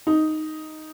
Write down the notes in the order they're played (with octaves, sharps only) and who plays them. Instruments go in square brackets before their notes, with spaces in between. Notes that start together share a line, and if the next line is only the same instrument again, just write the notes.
[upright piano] D#4